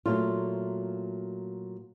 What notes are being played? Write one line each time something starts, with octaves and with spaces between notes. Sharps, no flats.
A#2 F#3 A3 F4